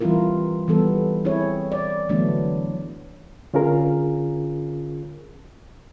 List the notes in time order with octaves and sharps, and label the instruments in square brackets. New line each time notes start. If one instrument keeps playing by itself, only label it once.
[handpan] E3 G3 C4 E4 F4 A#4
E3 G3 B3 A4
C4 E4 G#4 C#5
D5
D3 E3 F#3 A3 B3 D4
[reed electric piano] D3 C#4 F4 G#4 A#4